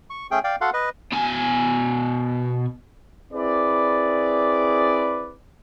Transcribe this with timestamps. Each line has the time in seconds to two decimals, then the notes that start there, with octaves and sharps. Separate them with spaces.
0.10 C#6
0.31 A3 C#4 G#4 G5
0.44 D5 F5 G5
0.61 F#4 A4 F5 F#5 C6
0.73 B4 D#5
1.12 B2 G#5
3.33 C4 E4 G#4 B4 D5